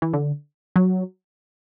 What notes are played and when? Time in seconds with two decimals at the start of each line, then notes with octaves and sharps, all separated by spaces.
0.02 E3
0.13 D3
0.76 F#3